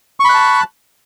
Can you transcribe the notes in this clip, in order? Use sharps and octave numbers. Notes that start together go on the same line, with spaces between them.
A5 B5 C#6 F#6